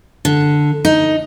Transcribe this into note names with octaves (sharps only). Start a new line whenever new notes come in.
D3
D#4